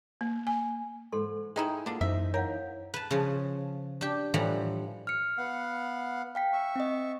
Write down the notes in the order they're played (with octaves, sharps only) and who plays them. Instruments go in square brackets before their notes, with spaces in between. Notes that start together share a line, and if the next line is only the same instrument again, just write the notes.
[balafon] A#3
G#5
[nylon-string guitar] G#2 [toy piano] A4 C6
[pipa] G#3 D#4 E4 [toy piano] G#4 [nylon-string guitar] G5
[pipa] D3 D4 [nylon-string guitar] A#3 F4
[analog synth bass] F#2 [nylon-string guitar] E3 D#4 C5 [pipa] E5
[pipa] A#4 [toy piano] C#5 F5 F#5
[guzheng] B4 A5
C#3 F3
D4 G4
A2 E3 F3 G3 F#5 A#5
[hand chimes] F6 C#7
[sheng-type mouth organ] B3 F5 F#5
[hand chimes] F5 G5 B6
[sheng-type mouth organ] E5 C#6
[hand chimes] C4 D#5